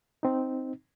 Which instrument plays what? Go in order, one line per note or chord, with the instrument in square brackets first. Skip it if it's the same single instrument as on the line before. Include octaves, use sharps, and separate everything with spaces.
[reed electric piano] C4 D#4